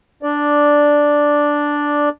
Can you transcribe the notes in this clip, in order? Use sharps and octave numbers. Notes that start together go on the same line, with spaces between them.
D4 D5